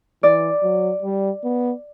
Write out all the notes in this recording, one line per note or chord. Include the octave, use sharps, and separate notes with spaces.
E3 D5
F#3
G3
B3